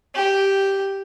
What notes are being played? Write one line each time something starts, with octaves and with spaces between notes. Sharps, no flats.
G4